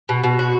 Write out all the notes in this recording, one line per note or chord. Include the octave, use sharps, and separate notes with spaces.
B2
B2
F#4